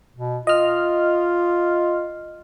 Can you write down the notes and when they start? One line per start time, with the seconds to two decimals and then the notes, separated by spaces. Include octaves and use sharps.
0.16 B2
0.47 F4 D#5 F6